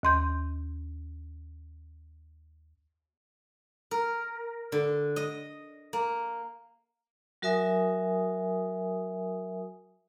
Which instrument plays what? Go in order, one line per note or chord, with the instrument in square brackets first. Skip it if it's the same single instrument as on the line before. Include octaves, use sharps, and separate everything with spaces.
[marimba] D#2 C6 G6
[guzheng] A#4
D3
D#5
A#3
[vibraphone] F#3 F#4 A#4 E5 G#5 D#6